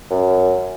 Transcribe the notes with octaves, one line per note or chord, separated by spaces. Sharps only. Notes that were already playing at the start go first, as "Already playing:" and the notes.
F#2